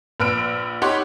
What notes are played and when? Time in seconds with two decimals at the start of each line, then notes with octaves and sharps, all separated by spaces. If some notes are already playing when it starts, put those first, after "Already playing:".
0.20 A#1 B4 E6 F6 D7
0.82 D#4 G4 C#5 F#5 B5 C6